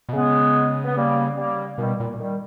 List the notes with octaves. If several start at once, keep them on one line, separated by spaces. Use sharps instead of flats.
B2
C#3 G#3 B3
B3
G3 A#3
G3 A#3
B2 D#3 G3
A#2
D#3 G3